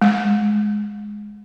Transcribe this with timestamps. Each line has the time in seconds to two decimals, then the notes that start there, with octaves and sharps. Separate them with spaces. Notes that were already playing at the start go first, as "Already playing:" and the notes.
0.02 G#3